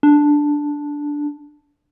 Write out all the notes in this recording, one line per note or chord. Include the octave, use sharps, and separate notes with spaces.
D4